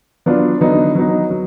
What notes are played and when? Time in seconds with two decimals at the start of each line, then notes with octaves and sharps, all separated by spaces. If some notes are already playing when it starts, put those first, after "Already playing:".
0.26 F#3 B3 D4 F4
0.61 D3 F#3 B3 D#4
0.95 F#3 B3 D#4
1.30 F#3